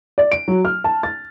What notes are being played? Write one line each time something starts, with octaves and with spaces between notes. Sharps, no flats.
D5
D7
F#3
F6
A5
A6